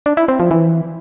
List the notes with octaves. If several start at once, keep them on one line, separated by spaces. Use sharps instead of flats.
D4
E4
C4
F3
E3